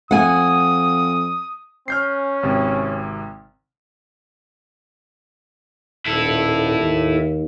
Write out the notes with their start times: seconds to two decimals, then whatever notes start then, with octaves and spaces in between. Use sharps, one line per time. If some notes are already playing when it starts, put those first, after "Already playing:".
0.11 F2 F#5 G#5 D#6
1.88 C#4 F6 G6 C7
2.43 G#1 C3
6.06 D#1 E4 A4
6.80 D#2